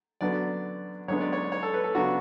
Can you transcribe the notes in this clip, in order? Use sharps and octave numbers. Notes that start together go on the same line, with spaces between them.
F#2 D3 F#3 B3 D4 D5
F#2 D3 G#3 B3 C#5
D5
C#5
C#5
A4
B4
A4
C#3 F#3 B3 D4 F#4